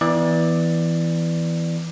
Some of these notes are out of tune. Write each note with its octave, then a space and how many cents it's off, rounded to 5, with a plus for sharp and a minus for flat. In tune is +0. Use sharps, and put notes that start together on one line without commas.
E3 +0 B3 +5 D5 +10